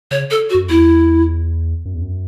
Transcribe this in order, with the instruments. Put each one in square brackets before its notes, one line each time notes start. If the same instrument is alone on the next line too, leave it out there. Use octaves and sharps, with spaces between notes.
[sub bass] C#3 [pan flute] C#5
[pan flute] A4
F#4
[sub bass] F#2
[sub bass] E2 [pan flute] E4
[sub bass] F#2
E2
F#2